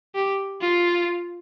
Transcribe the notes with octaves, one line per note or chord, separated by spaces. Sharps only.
G4
F4